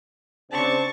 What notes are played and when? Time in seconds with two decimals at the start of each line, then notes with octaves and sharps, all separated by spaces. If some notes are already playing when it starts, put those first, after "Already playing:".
0.51 C#3 C4 D4 A5 C#6